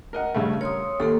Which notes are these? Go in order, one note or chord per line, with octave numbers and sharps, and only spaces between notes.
A#4 D#5 F#5
G2 C#3 A3
A#4 C#5 C6 D#6
D#2 A#3 G4 A4